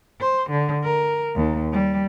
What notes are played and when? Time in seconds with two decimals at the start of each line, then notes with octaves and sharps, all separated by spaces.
0.21 C5
0.50 D3
0.84 A#4
1.36 D#2
1.72 G3